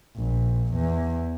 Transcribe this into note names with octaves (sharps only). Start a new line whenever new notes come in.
A#1
E2